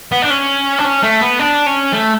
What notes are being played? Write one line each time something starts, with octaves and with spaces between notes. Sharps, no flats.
B3
D4
C#4
D4
C#4
A3
B3
D4
C#4
A3